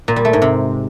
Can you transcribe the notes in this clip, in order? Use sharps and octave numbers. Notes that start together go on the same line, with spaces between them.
A#2
G3
A3
G#2
C3